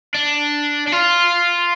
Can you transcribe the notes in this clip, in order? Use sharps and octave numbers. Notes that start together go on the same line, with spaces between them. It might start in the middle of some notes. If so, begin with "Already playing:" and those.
D4
D4
F4